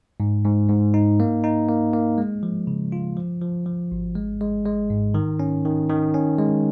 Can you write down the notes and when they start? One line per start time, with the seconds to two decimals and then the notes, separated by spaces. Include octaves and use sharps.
0.20 G#2
0.44 G#2
0.69 G#2
0.94 D#4
1.20 A#3
1.44 D#4
1.69 A#3
1.93 A#3
2.18 G#3
2.43 F3
2.67 C#3
2.92 F4
3.17 F3
3.42 F3
3.66 F3
3.92 G#1
4.15 G#3
4.41 G#3
4.65 G#3
4.90 G#2
5.14 D#3
5.40 C#4
5.65 D#3
5.90 D#3
6.14 C#4
6.39 G#3